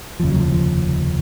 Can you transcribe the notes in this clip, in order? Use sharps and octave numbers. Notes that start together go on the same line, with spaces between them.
F1 D#2 C#3 F3
F#3
F3
F3